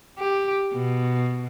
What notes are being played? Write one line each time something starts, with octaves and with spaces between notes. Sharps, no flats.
G4
B2